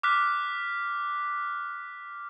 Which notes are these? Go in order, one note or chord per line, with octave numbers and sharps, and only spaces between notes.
D6 F6 F#6 B6